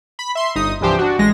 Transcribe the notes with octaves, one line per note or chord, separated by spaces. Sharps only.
B5
E5 C6
G1 D#4 D#6
C2 G2 E3 F3 G4 C5
D4 F#4
A1 G#3 A#6